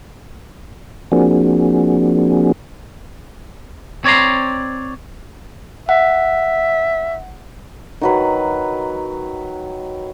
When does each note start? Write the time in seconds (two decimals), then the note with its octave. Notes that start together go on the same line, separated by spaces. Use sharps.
1.12 F3 A#3 C4 D4 F#4 G#4
4.04 C4 C#5 D5 A#5 C6
5.89 E5 F#5
8.01 D#3 F#3 B4